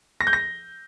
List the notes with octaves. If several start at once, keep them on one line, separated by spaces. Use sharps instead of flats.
A#6
G6
A#6